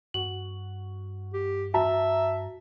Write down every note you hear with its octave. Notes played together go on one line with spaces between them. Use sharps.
G2 F#4 F#7
G4
F#4 E5 A5 A#5